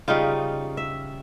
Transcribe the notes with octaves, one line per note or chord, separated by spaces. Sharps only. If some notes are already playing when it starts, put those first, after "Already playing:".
C#3 G3 D#4 F4
E5